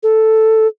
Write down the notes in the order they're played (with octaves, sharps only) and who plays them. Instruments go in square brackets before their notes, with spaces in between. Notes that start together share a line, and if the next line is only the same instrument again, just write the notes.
[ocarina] A4